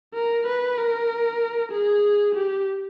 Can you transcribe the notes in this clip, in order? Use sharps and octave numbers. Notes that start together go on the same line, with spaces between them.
A#4
B4
A#4
G#4
G4